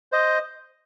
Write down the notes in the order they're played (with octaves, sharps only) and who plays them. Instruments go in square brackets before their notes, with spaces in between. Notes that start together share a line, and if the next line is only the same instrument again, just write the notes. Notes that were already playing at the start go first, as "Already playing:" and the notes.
[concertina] C5 D#5